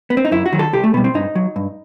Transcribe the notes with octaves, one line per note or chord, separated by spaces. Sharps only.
B3
C4
D#4
F#2 E4
F#4
D#3 F#3
A4
C2 G4
A3
B2 G3 B3
C4
G2 D#4
F#3
G2